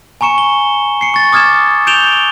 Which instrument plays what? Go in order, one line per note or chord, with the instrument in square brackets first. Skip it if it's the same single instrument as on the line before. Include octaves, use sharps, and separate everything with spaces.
[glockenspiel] G#5 A#5 C#6 C#7 E7
G7
C7 C#7
C#6 A6
D6 D#6 F6 G#6 A6 E7
G6 D7 E7 F7 G7